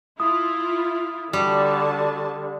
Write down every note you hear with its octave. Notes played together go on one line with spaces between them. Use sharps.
E4 F4 D#6
D3 G3 F#4 A5